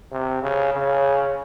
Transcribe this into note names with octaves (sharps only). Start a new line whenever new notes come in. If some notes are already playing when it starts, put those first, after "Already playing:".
C3
C#3
C#3